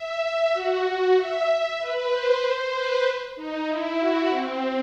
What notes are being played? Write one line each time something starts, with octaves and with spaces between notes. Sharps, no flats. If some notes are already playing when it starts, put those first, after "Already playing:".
Already playing: E5
F#4
F#4
E5
E5
B4
C5
C5
B4
D#4
E4
F#4
C4